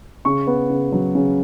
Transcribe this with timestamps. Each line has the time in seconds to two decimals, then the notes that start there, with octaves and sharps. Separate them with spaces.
0.25 C#3 C#6
0.47 B3
0.70 C#3
0.92 F#3
1.15 C#3